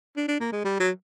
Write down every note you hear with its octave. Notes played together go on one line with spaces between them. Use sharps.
D4
D4
A#3
G#3
G3
F#3